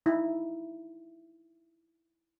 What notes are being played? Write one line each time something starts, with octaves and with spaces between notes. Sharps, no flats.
D#4 E4